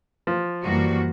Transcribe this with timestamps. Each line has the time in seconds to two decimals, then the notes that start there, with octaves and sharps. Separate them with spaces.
0.27 F3
0.62 F#2 E3 G3 A#3 F#4